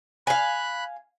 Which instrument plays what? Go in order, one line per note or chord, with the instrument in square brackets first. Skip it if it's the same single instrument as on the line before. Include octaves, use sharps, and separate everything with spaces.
[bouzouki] F5 G#5 [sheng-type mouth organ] B5 F#6